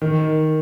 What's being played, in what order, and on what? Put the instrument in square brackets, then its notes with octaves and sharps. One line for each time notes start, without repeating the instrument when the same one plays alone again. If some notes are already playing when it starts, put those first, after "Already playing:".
[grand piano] D#3